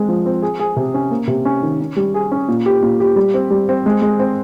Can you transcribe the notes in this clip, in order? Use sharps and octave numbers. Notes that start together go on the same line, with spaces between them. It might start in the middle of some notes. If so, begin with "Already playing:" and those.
Already playing: G#3 C4
F3
C4
G#4
G#4
C3
C#4
A#3
C3
C#4
D#3
C#4
G3
G#4
C#4
A#2
G4
A#2
G4
G3
C4
G3
C4
G#3
G#3
C4